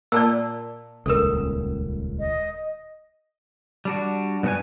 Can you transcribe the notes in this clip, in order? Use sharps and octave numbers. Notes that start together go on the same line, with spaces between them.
A#2 D5 A5 E6
D#1 G#1 C#2 A4 A#4
D#5
G3 D4 F#4
G2 B2 B3 F#4 B4 G#5